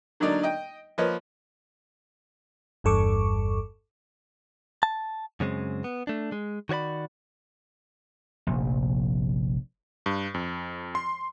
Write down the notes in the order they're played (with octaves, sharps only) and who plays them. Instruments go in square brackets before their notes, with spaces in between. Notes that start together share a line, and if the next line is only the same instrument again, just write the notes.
[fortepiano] D3 F#3 A#3 D4 D#4 D5
D#5 G5
F3 A#3 B4 C#5 D#5
[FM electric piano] G1 E2 G2 A4 C#6 D6
[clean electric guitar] A5
F#2 C#3 G#3 C4
B3
A3 D4
G#3
D#3 F#4 C#5 D5 B5
[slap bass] F1 A#1
[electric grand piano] G2
F2
C6